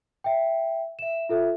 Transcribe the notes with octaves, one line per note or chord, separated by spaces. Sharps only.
E5 G5
E5 E7
F4 A4 E5